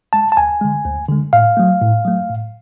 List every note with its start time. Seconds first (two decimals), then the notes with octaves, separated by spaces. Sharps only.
0.13 G#3 A5
0.32 A5
0.37 D2 G#5
0.61 D3 G#3
0.85 D2
1.08 D3 G#3
1.33 A2 F5
1.57 F#3 A3
1.81 A2
2.05 F#3 A3
2.29 A2